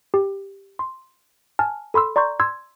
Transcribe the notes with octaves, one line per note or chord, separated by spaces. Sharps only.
G4
C6
G#5 A5 F6
A4 B5 C6 E6
D5 A#5 C6 C#6 G6
C6 E6 G#6